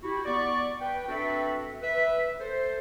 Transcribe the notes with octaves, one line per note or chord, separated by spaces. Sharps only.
E4 F#4 G4
B3 D5 C#6
B4 G5
C4 D4 F#4 A4 B4 E5
B4 E5
A4 C5